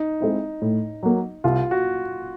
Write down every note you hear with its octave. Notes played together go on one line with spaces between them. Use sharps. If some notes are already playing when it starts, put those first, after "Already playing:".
Already playing: D#4
G#3 C4 E4
A2
F#3 A#3
C2 F4
F#4